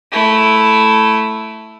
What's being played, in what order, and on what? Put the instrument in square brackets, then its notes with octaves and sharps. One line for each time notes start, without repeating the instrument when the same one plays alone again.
[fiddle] A3 E4